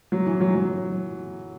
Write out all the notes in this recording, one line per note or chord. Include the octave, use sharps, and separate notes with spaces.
F#3
E3
F#3
F#3